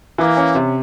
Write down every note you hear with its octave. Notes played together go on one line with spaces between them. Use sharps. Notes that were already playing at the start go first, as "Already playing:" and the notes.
E3 A#3
C#4
C3